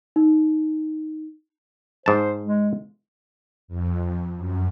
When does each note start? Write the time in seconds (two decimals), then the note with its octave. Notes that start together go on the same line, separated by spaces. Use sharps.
0.16 D#4
2.06 G#2 C5 A5
2.43 G#3
3.68 F2
4.36 F#2